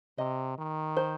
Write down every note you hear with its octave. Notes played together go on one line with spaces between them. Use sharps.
C3 D#5
D#3
C5